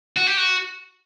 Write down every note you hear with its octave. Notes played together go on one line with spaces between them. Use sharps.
F#4
G4
F#4